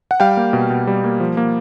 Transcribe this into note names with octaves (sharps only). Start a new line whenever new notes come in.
F#5
G3 F5 G5
A#3
B2
B2
G3
A#3
F3
A#3